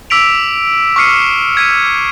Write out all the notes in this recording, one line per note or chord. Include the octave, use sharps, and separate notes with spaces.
D6 E6 B6 D7 F7
C#6 D6 F6 C7 C#7 D#7
G#6 B6 D#7